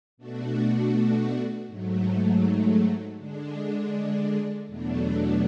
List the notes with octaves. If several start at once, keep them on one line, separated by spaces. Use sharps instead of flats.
B2 A3 D4 F#4
G#2 F#3 A3
D3 G#3 D4
E2 B2 F#3 A3 D4